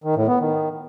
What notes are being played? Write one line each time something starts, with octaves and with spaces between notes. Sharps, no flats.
D#3
A2
B3
D#3